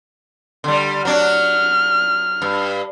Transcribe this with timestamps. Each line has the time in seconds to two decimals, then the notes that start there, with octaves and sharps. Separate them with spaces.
0.64 D3 G3
1.05 F#3 D4 F#4 F6
2.42 G2